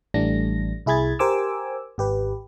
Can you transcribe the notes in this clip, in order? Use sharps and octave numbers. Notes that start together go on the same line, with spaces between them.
A1 E3 G3 A3 D4 A#6
C2 E4 G#4 B5 G#6 A6
G4 A#4 C5 G#5 D6 E6
G#1 G4 B4